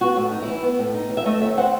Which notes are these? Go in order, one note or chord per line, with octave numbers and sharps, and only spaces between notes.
B3 F#4
A2
D#4
E4
E3
B3
A2
D#4
E3
E5
A3 D#5
D#2 E5
C4 F#5